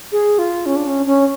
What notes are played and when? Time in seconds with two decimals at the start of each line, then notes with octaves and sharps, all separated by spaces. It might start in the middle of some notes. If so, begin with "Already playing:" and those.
0.12 G#4
0.39 F4
0.66 C#4
0.76 D4
0.87 C#4
1.06 C#4